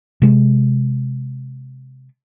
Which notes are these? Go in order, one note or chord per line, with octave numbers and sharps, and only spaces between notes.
C3 G#3